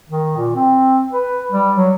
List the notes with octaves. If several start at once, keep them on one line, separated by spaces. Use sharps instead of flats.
D#3
A#2
C4
B4
G3
F#3